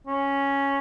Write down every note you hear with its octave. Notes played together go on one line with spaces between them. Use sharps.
C#4